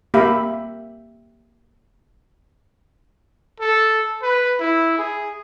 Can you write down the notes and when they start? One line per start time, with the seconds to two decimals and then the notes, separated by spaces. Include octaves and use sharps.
0.14 A#3 G4 E5 F5 B5
3.60 A4
4.22 B4
4.60 E4
4.98 G#4